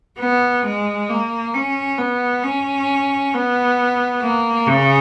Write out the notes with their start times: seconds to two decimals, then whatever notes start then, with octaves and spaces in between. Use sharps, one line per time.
0.20 B3
0.65 G#3
1.09 A#3
1.54 C#4
1.98 B3
2.43 C#4
3.33 B3
4.22 A#3
4.66 C#3